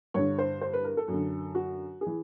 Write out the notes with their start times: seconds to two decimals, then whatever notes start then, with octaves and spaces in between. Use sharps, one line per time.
0.14 G2 D3 C#5
0.39 C5
0.61 C5
0.73 B4
0.84 A#4
0.97 A4
1.08 F#2 D3
1.55 F#4
2.01 G#4
2.06 E3